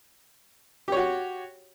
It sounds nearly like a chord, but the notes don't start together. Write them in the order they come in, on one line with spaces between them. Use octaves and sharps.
G4 C#5 F#4